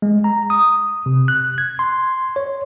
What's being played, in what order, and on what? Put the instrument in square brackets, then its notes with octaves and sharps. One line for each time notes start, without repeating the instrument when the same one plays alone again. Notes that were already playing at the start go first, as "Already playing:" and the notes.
[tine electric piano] G#3
A#5
D#6
C3
F#6
G#6
C6
C#5